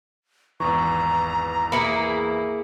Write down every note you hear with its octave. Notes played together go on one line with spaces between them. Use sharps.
G#1 E2 E3 A#5 C#6
A#3 E4 G#4 B5 C#7 F#7